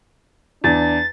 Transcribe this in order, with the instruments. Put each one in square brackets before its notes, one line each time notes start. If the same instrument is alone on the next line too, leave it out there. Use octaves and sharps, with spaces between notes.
[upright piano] E2 [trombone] D4 [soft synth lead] A6